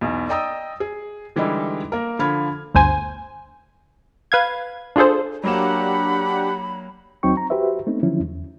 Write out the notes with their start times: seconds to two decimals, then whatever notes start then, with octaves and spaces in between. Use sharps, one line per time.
0.01 B1 E2
0.29 D5 D#5 G5 A#5 D#6 E6
0.80 G#4
1.36 D3 E3 G3 G#3 D#4 E4
1.92 A#3 A#4
2.19 D3 F3 B5 F6 G#6
2.74 G1 D2 C5 G#5
4.32 B4 F5 G#6
4.96 D4 F4 G#4 A4 C5
5.43 F#3 A#3 D4 G4 F#5 B5 E7
7.23 D#2 F#3 C4 D#4 G5 C#6
7.37 A#5
7.50 F#4 G4 B4 C5 E5
7.87 A3 B3 C4 D#4
8.03 D3 D#3 F3 F#3 C#4 E4
8.20 E2